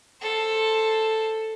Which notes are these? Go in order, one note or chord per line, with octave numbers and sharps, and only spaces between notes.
A4 C5